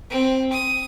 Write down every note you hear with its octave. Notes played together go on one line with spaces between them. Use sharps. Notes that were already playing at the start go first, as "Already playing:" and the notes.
C4
D#6